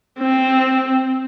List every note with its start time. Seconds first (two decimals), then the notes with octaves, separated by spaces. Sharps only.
0.19 C4